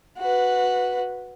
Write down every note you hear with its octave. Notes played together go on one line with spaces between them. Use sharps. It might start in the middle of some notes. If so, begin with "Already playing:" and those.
F#4 B4